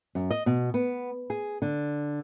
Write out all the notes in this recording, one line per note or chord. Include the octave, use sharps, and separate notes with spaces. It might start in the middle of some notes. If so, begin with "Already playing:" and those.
F#2
D#5
B2
B3
G#4
D3